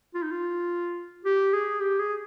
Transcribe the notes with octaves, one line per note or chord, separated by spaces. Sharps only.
F4
D#4
F4
G4
G#4
G4
G#4